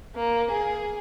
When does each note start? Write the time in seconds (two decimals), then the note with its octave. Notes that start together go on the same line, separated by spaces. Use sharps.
0.16 A#3
0.51 G#4